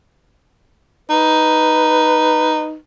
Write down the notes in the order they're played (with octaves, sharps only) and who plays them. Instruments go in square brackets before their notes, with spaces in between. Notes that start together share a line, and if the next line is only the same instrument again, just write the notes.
[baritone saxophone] D#4 [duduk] B4